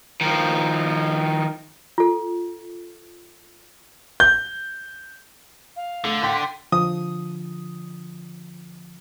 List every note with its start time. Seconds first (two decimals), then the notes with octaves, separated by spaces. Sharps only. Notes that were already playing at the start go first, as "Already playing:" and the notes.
0.21 D#3 F3
1.98 F4 A4
4.20 G6
5.76 F5
6.04 D3 A3
6.22 G5 C6 B6
6.72 D3 F3 D#6